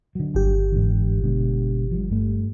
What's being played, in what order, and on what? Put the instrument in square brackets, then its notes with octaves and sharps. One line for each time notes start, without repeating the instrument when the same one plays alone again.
[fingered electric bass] D3 F#3
[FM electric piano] G1 G4
[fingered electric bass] G#2 D3 E3
B2 D3 G#3
F3 G3
G2 A3